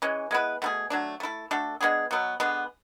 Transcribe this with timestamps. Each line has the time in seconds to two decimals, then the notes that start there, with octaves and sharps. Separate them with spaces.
0.02 E3 G#3 C#4
0.31 G#3 B3 E4 B4
0.62 B2 A3 E4 G#4
0.90 F#3 A3 D4
1.20 A3 E4 A4
1.51 A3 D4 F#4 A4
1.81 G#3 B3 D4 G#4
2.11 B2 F#3 B3
2.40 D3 G#3 B3